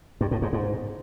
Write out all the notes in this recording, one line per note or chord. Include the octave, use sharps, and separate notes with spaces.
G2
A2
G#2
G#2